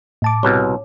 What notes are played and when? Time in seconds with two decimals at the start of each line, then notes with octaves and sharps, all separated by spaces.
0.22 A2 A5 D6
0.43 C2 B2 C#5